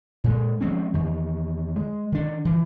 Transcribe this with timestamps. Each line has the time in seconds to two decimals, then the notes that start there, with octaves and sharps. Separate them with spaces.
0.24 A#2 G#3
0.61 F3 G#3 C4 C#4
0.94 E2 D#3
1.76 G#3
2.12 D#3 D4
2.45 E3 F3